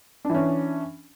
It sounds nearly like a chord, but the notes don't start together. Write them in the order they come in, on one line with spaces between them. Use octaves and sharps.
D4 E3 C#4